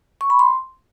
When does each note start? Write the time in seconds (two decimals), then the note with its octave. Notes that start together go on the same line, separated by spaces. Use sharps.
0.21 C#6
0.30 B5
0.39 C6